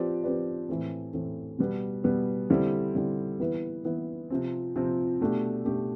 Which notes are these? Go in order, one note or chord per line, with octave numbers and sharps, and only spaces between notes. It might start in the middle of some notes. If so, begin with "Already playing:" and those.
Already playing: F3 C4 G4 B4 D5
F3 C4 G4 B4 D5
A2 E3 A3 C4
A2 E3 A3 C4
B2 G3 B3
B2 G3 B3
D3 G3 C4 E4
D3 G3 C4 E4
E3 B3 E4 B4
E3 B3 E4 B4
C3 F3 C4
C3 F3 C4
B2 A3 D4 G4
B2 A3 D4 G4